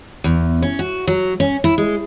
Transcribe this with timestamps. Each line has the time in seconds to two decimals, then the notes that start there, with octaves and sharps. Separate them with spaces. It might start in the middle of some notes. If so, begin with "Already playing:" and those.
0.24 E2
0.62 C#4
0.79 F#4
1.07 F#3
1.40 C#4
1.64 E4
1.78 G#3